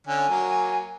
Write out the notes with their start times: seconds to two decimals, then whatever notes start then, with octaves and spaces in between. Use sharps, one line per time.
0.07 D3 C#4 G#5
0.29 F#3 A#3